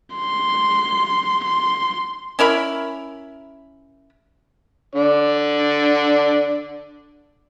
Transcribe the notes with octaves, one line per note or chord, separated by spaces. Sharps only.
C6
C6
C#4 E4 A#4 B5
D3 D5